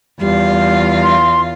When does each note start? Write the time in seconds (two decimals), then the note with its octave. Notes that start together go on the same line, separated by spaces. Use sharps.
0.20 E2 G3 F4 F5
1.04 C6